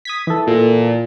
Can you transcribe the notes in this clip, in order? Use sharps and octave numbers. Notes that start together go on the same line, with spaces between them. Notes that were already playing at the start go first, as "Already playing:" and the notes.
D#6 G#6 B6
E3 A4
A#2